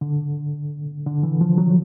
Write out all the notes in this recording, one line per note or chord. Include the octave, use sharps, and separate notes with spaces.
D3
D3
E3
F3
F#3